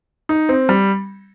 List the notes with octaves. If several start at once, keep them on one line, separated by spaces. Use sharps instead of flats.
D#4
C4
G3